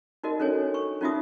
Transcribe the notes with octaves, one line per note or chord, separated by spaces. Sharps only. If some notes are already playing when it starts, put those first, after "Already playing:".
D#4 F#4 A#4 D#5
C#4 D4 A4 C#5 G#5
C#6
C#4 D#4 F4 F#4 E5 D#6